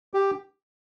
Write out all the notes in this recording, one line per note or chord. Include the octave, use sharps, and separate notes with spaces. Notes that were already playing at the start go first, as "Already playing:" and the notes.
G4